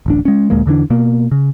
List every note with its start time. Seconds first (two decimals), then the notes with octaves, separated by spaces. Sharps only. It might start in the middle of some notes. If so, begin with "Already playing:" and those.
0.06 D1 A1 D4
0.25 G#3 C#4
0.50 D2 A#2 G#3 A#3
0.66 E2 D3 E3 D4
0.90 B2 A#3
1.32 C#3